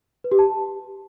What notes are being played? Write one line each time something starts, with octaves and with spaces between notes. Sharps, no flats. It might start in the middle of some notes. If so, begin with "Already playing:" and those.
B4
G4
A5